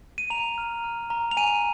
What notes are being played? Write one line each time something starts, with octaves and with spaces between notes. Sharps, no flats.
D#7
A#5 F7
F6
F6
A#5
F7
G#5 D#7